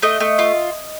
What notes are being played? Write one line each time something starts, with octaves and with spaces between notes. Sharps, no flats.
A3 D#5
A3
F4